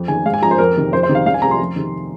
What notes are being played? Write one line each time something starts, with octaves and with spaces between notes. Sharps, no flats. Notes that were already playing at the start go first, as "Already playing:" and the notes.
Already playing: F2
D#3 G#5
G#2 F5
G#5
F3 A#5
C5
F2 A#4
C3 D#3
F2 C5
C5
C3 D#3
F5
C2 F5
G#5
C3 A#5
F3 C6
F2
C3 D#3